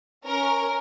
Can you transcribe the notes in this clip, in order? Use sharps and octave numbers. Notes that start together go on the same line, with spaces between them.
C#4 A#4